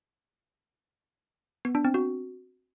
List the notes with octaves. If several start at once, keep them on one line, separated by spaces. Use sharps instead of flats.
B3
D4
C4
F#4